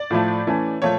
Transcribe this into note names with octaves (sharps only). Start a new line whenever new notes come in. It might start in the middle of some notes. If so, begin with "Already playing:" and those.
Already playing: D5
A2 F3 A3
E3 A3 C#4
A#2 F3 A3 C#5